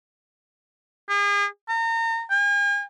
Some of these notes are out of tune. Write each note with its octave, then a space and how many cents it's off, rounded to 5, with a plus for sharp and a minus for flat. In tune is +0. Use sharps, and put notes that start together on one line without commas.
G#4 -40
A#5 -35
G#5 -45